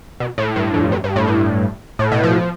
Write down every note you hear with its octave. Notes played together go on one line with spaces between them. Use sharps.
B2
A2
G2
F2
G2
G2
A2
G2
A2
B2
F3